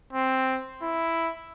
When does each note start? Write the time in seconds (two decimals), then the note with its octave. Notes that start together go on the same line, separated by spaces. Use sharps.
0.13 C4
0.82 E4